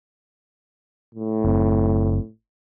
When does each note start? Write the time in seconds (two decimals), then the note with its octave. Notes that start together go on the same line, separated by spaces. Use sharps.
1.15 A2
1.44 F#1 C4